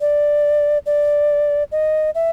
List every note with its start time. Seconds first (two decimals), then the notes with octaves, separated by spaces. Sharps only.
0.01 D5
0.86 D5
1.72 D#5
2.15 E5